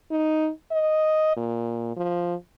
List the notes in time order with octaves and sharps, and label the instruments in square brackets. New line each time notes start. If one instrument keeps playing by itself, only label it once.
[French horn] D#4
D#5
A#2
F3